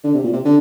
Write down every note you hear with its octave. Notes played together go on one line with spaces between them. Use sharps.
D3
C3
A#2
C3
D3